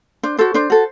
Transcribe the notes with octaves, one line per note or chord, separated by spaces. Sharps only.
D4 C5
F#4 A4 C5
D4 C5
F#4 A4